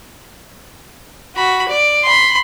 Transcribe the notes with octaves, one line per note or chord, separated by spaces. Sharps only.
F#4 B5
D5
B5 C6